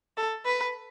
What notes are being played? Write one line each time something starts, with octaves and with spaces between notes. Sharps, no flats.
A4
B4